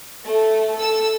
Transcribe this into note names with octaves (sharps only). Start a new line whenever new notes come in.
A3
A4 E6